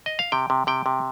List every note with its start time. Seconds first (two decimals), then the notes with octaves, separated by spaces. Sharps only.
0.06 D#5
0.19 F5
0.32 C3 G5
0.50 C3
0.67 C3 G5
0.86 C3